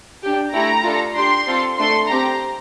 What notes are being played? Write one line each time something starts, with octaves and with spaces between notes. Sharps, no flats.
D4 G4
A3 E4 G4 A#5
D4 F4 A4
D4 G4 C6
C4 F4 A4
A3 D4 A4 C6
C4 G4 A#5